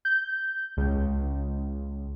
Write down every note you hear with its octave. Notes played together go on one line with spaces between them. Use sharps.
G6
C#2